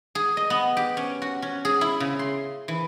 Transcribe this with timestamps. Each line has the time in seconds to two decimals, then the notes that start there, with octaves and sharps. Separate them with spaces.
0.15 G#4
0.37 D#5
0.50 B3
0.77 G4
0.97 C#4
1.22 F#4
1.42 C#4
1.65 G#4
1.81 E4
2.00 C#3
2.19 C6
2.68 E3